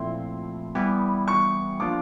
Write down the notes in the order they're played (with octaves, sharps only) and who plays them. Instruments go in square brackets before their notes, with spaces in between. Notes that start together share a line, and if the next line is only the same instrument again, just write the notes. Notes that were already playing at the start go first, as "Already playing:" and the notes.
Already playing: [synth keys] A#2 F3 A3 C4 E4 [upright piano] C6
[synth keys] E3 G3 B3 E4 G4
[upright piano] C#6
[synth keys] F3 A#3 D4 F4 [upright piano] D6